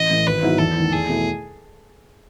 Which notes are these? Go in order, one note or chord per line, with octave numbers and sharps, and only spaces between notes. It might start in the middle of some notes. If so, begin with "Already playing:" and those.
Already playing: A1 D#5
A2 E3
G#1 B4
G#2 F#3 B3 E4
E2 A4
D#3 A3 E4
E2 G#4
B2 A3 E4